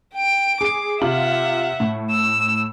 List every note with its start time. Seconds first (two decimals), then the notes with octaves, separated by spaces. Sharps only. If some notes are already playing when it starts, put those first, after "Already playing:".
0.14 G5 D7
0.61 G#4 D6 D7
1.02 C3 F4 E5 F#5 F#7
1.80 A2
2.11 E6